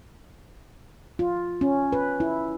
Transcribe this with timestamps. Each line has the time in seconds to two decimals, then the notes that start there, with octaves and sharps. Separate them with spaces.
1.19 F4
1.61 C#4
1.93 B4
2.20 E4